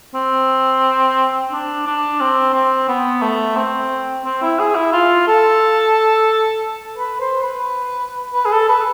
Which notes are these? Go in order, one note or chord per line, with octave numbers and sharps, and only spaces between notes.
C4
D4
D4
C4
C4
B3
A3
C4
C4
E4
G#4
E4
F4
A4
B4
C5
B4
B4
G#4
A4
B4